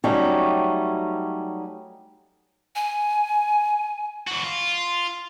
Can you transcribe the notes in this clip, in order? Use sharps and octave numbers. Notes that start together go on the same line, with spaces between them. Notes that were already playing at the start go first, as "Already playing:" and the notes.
F#3 G3 A3 C#4 D#4 G4
G#5
E3 F#4
F4